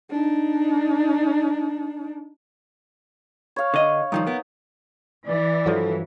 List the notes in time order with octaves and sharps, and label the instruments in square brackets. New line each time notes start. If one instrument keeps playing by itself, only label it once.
[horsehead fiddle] D4 D#4
[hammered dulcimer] C#5 F5
[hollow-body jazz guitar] D3 D#5
[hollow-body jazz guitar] G2 D#3 F3 [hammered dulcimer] D#4
[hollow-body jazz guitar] B3 A#4
[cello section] E3 [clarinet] D5
[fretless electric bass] G2 F3 F#3 [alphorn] A4